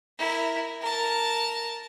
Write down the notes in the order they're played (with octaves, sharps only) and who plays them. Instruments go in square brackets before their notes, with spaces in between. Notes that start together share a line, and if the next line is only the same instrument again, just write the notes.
[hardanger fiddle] E4 A#4
A#4 A5